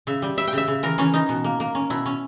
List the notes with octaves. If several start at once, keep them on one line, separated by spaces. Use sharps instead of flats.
C#3 E5
G3
G3 E5
G5
C#3 E5
C#3
E3 A#4
E3 C#4
E3 D#4
B2
A#3
A#3
C#4
B2 E4
C#4